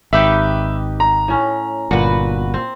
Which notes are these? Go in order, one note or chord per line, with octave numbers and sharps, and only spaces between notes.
G#1 D#4 G4 B4 E5
A#5
A2 C#4
G1 A#2 F#4 B4
C4